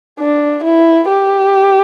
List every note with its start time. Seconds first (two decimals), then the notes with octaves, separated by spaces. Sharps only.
0.19 D4
0.63 E4
1.09 G4